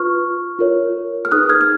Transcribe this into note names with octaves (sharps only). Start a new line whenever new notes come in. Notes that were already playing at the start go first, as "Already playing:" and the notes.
Already playing: F4 B4 C#6 F6
F4 A#4 C#5
F6
D#4 G#4 B4 D#6 F#6
F6 G#6
F6